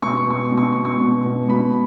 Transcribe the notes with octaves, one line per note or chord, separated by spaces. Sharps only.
B2 C#6
B2 C#6
B2
C#6
B2
C#6
B2
B2
B2 B5